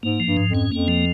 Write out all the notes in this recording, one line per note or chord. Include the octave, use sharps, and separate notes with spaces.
G#2 A#3
F3
G2
G#2
F2
C#4
F2 A#3
F3